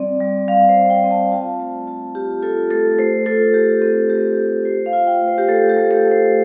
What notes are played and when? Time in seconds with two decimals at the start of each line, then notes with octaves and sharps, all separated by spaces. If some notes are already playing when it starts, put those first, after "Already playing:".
Already playing: G3 C4 D5
0.20 G3
0.48 G3 F5
0.69 C5
0.76 C4
0.90 G5
1.04 C4
1.11 A5
1.32 F4 A5
1.59 A3 A5
1.87 F4 A5
2.15 F4 G4
2.43 F4 A4
2.71 A3 A4
2.98 A3 C5
3.26 F4 A4
3.54 A3 G4
3.82 C4 A4
4.10 A3 G4
4.37 C4 A4
4.65 F4 C5
4.86 F5
4.93 F4
5.07 G5
5.21 A3
5.28 C5
5.38 G4
5.49 A3 A4
5.70 G4
5.76 A3
5.91 A4
6.04 A3
6.11 C5